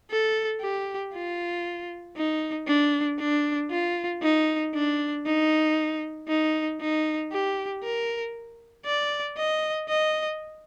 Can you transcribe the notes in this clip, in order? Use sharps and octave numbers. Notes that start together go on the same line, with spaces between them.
A4
G4
F4
D#4
D4
D4
F4
D#4
D4
D#4
D#4
D#4
G4
A#4
D5
D#5
D#5